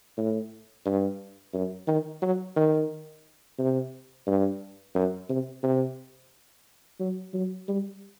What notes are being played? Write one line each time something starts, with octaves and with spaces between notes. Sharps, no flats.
A2
G2
F#2
D#3
F#3
D#3
C3
G2
F#2
C3
C3
F#3
F#3
G3